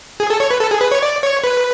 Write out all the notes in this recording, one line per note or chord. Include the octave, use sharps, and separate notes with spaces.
G#4
A4
C#5
B4
A4
G#4
B4
C#5
D5
C#5
B4